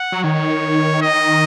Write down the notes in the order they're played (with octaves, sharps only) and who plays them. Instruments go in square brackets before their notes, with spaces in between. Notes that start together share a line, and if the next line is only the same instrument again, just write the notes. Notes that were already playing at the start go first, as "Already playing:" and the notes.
Already playing: [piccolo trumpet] F#5
[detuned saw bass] F#3
[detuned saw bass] D#3 [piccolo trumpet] C#5
[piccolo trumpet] D#5